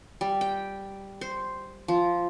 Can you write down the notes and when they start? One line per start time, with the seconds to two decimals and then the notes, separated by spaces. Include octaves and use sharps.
0.21 G3
0.41 G5
1.21 C5
1.88 F3